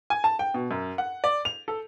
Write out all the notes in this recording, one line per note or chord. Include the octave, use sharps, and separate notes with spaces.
G#5
A5
G5
B2
F#2
F#5
D5
F7
A4